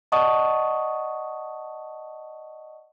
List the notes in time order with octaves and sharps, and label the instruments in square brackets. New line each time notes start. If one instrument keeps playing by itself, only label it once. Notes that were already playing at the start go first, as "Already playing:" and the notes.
[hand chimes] D5 D#5 F#5 A5 C#6 D#6